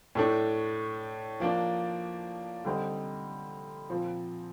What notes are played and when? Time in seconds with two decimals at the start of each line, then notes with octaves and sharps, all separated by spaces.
0.15 A2 A3 D4
1.40 F3 A#3 D4
2.65 D3 G3 C4 D#4
3.89 A#2 F3 C4